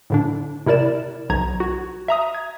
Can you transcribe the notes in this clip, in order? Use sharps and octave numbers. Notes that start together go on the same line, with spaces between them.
A2 D3 D4
C3 E4 A#4 D5 E7
B1 A#5 G#6
F#4
E5 A#5 D#6
G#6